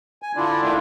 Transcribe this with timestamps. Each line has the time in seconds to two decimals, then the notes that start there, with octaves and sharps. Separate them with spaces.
0.22 G#5
0.36 D3 D4 E4 F4 D5
0.63 D#3 A3 D4